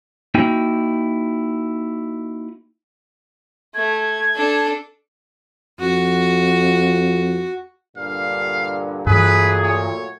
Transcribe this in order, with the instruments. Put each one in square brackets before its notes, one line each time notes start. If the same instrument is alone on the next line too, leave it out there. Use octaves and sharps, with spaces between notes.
[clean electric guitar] A#3 D#4 E4 F#4 G5
[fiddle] A3 [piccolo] G#6
[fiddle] D4 A4
[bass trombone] F2 [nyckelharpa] F#4
[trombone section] G2 A#2 D3 [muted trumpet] F5
[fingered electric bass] G2 E3 [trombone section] A#2 F#3 A3 [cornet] G#4 [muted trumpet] B4
[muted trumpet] C#5